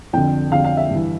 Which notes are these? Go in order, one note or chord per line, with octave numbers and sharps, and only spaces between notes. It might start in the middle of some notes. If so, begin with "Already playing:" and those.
F2 D3 G5
F2 D3 F5
F5
E5
G2 E3